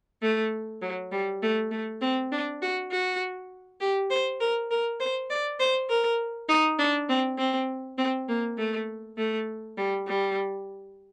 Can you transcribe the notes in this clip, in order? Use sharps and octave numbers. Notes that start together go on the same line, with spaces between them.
A3
F#3
G3
A3
A3
C4
D4
F#4
F#4
G4
C5
A#4
A#4
C5
D5
C5
A#4
D#4
D4
C4
C4
C4
A#3
A3
A3
G3
G3